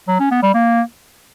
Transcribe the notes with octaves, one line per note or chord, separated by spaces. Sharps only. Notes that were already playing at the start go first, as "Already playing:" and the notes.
F#3
C#4
B3
G3
A#3